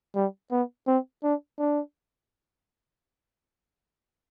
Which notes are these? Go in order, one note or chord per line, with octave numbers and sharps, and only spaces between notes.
G3
B3
C4
D4
D4